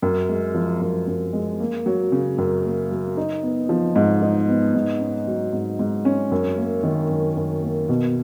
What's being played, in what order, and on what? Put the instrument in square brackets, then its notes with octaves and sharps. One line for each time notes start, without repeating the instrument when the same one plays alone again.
[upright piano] F#2
G#3
F3
F#2
F#2
G#3
A#3
F#3
C#3
F#2
A#3
F#3
D#4
B3
F3
G#2
D#4
B3
G#2
C#4
F#3
G#2
G#2
C#4
F#2
A#3
D#3
F#2
F#2
A#3
B2